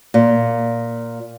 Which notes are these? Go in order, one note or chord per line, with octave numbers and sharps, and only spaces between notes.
A#2